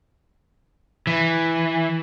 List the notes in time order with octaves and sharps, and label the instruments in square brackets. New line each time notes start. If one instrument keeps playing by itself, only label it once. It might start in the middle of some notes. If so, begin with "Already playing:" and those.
[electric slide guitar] E3